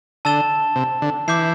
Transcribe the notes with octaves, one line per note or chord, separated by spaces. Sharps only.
D3 A5 E6 A6 E7 G7
C3
D3
E3 D6 G6 C7 E7